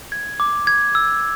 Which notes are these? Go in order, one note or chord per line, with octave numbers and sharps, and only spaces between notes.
G#6
D6
G#6
E6